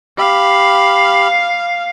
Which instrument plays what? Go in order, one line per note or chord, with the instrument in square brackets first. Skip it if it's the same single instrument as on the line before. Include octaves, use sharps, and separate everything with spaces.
[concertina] G4 B5 [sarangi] F5